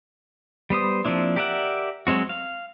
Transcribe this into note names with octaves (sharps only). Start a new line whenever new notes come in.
G3 B3 C5 D#6
F3 A#3 C4 D4 E4
G4 A#4 D5 E5 F#5
F#3 G#3 C4 F#4
F5